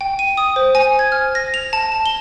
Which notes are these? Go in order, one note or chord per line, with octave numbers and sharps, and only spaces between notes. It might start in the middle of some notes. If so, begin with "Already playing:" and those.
G5
D#7
D#6
C5
G#5
G#6
F6
A#6
F7
A5
E7
G7